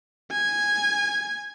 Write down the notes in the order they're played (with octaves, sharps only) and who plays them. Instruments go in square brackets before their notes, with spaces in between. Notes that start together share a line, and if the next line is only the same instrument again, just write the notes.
[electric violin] G#5